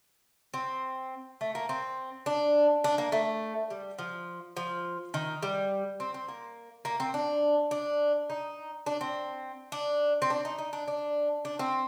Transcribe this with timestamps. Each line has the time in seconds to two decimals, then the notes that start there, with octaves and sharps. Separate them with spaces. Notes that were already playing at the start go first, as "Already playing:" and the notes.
0.54 C4
1.41 A3
1.55 A#3
1.69 C4
2.26 D4
2.84 D4
2.98 A#3
3.12 A3
3.70 G3
3.99 F3
4.57 F3
5.14 D#3
5.43 G3
6.00 C4
6.14 C4
6.28 A#3
6.85 A#3
7.00 C4
7.14 D4
7.71 D4
8.30 D#4
8.86 D4
9.01 C4
9.72 D4
10.22 C4
10.30 D4
10.45 D#4
10.59 D#4
10.73 D4
10.88 D4
11.45 D4
11.59 C4